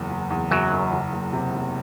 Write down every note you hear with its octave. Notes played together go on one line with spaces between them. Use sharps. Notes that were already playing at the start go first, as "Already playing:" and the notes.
Already playing: F#1 E2
F#1
E2
F#1 F#2 F#3
F#1
F#1
F#1
C3
F#1